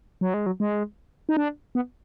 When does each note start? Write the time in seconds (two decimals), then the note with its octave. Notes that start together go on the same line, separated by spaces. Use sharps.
0.21 F#3
0.34 G#3
0.46 F#3
0.60 G#3
1.29 D#4
1.37 D4
1.75 B3